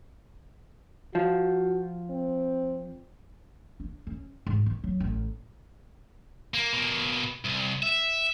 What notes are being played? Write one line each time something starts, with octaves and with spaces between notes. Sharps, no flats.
F3 F#4
C4
D4
C#4
G#2
D#3
F#3
A1
A#3
B2 A#3
C2
E5